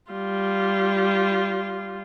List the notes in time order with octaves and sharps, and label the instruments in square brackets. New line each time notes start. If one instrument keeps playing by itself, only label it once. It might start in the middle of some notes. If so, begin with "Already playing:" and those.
[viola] G3 F4